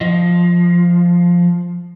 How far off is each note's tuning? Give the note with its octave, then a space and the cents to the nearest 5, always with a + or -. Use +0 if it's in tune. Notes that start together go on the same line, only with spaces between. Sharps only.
F3 +0 D#5 +25